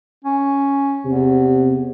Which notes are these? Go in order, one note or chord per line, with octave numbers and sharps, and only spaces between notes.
C#4
E2 C3